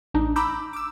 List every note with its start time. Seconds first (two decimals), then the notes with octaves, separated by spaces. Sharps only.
0.14 A1 D4 D#4
0.36 A#5 B5 D6 E6 G6
0.73 D6 E6